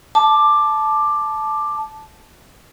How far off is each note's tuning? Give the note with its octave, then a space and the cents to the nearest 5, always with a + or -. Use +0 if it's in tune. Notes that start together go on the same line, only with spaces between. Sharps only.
A5 -10 D6 +10